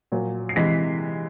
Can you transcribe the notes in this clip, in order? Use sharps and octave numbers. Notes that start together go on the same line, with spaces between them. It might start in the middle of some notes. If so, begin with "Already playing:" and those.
A#2 F#3
C7
C3 E3 G#3 B6